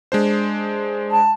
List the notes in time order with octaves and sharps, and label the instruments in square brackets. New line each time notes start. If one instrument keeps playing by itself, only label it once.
[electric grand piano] G#3 D4 C5
[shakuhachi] A5